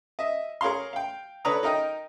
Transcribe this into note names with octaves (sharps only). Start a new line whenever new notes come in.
D#5 E5
G#4 A#4 C#5 F5 C6
F5 G5
D3 D4 B4 C#5 A#5 D#6
D#4 A#4 D#5 G5